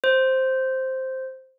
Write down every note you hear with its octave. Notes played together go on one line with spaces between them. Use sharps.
C5